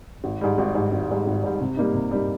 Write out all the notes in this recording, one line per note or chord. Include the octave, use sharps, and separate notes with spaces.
G#1
G#2 G3
G#1
G#2 G3
G#1
G#2 G3
G#1
G#2 G3
C3
G3 A#3 D#4
C3
G3 A#3 D#4